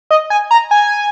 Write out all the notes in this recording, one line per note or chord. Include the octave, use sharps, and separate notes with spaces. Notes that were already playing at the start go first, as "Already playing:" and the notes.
D#5
G#5
A#5
G#5